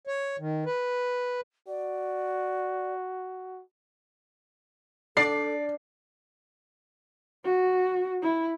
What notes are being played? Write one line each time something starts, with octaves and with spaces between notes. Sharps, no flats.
C#5
D#3
B4
F#4 D5
D4 A4 D5 C7
F#4
E4